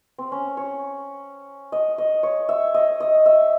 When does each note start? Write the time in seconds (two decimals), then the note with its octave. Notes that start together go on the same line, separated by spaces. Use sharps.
0.18 C4
0.32 C#4
0.57 C#5
1.72 D#5
1.98 D#5
2.23 C#5
2.49 E5
2.74 D#5
3.00 D#5
3.26 E5